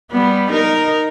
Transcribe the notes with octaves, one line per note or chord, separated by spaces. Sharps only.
G3 B3
D#4 A#4